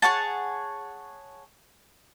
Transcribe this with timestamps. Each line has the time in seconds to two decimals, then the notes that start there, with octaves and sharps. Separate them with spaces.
0.02 G#4 C#5 F#5 A5